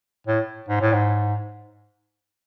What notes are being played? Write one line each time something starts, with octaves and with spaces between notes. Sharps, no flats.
A2
G#2
A2
G#2